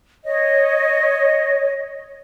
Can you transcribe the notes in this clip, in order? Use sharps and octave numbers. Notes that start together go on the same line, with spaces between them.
C#5 D#5